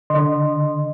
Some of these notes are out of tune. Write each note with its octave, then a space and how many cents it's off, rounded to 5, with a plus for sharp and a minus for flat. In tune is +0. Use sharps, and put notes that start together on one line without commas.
D3 +0 D#5 -25 C6 +0